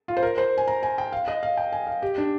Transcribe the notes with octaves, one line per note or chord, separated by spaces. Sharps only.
F4
C5
A#4
C5
G#5
A#5
G#5
G5
F5
D#5
F5
G5
G#5
F5
G4
D4